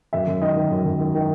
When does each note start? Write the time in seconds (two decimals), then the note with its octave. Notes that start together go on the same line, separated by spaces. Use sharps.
0.13 F#2 E5
0.28 F#2
0.42 D#3 D#5
0.56 D#3
0.71 F#2
0.86 F#2
1.00 D#3
1.15 D#3